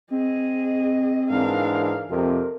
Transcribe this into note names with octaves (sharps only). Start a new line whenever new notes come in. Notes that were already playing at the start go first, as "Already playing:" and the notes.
C4 G#4 D#5
G#2 E3 D4 A#4 F5
F2 C3 C4 A#4